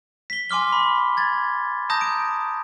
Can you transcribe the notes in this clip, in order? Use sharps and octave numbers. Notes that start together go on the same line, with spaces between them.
B6 G7
G#5 C6 D6 F6 G7
B5
G#6 A6
A5 A#5 D#6 G6 A#6
D7